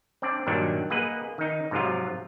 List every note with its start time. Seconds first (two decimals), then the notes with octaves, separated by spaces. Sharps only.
0.22 C4 D4 D5
0.47 G2 A#2 D#3 F#3 D4
0.90 A#3 G#4 B4 D#5 F#5
1.38 D#3 D#4
1.71 G#2 C3 F3 F#3 F4